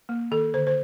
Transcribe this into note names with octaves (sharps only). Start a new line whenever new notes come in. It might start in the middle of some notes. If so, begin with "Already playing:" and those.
A#3
D#3 A4
D3 C5
C5